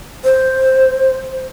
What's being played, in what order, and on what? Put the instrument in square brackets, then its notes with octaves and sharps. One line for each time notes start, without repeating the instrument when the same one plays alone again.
[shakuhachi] C5